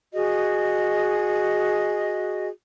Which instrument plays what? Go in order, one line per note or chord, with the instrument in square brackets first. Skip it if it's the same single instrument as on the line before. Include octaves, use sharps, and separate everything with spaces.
[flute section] F#4 G#4 D#5